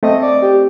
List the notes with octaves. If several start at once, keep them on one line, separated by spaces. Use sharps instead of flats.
A3 C4 D#5
D5
G4